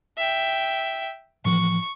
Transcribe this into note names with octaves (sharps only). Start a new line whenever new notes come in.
E5 G5
A2 E3 F3 C#6